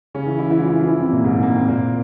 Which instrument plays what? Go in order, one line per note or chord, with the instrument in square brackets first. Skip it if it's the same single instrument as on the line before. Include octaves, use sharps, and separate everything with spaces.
[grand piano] C#3 C#4
E3 E4
E3 E4
E3 E4
F3 F4
E3 E4
F3 F4
E3 E4
C3 C4
A#2 A#3
G#2 G#3
A#3
C4
A#2 A#3